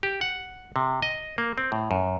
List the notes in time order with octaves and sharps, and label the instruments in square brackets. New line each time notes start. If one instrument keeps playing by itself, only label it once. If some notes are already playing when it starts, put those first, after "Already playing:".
[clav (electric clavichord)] G4
F#5
C3
D#5
A#3
C4
A2
F#2